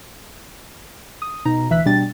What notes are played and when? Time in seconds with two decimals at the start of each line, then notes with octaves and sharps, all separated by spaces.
1.22 D#6
1.45 B2 D#4 A#5
1.70 D2 E3 E5 F#6 B6
1.86 B2 G3 D4 G5 A6